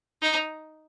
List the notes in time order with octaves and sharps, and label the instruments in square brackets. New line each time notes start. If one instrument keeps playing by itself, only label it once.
[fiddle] D#4